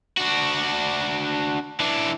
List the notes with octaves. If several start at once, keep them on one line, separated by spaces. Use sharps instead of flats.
D4 F#4
E3 D4